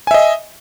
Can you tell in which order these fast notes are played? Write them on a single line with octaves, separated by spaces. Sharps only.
G#5 E5 D#5